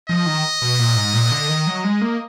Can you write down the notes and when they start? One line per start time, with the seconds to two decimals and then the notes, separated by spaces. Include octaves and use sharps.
0.09 F3 D#5
0.26 D#3
0.62 B2
0.79 A#2
0.96 G#2
1.14 A#2
1.31 D3
1.49 D#3
1.67 F#3
1.84 G#3
2.01 A#3